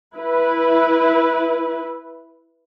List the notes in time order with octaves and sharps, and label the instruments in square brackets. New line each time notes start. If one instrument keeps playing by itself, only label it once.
[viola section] E4 B4